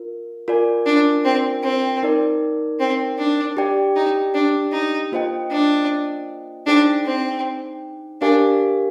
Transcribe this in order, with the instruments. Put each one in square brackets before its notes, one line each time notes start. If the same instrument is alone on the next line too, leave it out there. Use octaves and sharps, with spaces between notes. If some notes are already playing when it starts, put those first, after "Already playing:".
Already playing: [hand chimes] F4 A#4
F4 A#4 D5 G#5
[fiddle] D4
C4
C4
[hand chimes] D#4 A#4 D5
[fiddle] C4
D4
[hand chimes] G4 D5 G5
[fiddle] D#4
D4
D#4
[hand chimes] A#3 F4 C5 D#5 G5
[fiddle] D4
[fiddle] D4 [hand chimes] D#4 G#4 C5 G5
[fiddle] C4
[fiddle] D4 [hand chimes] G4 A#4 F5 G#5